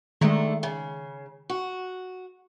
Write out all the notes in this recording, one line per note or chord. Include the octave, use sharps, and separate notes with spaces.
D3 D#3 G#3 A3
C#3
F#4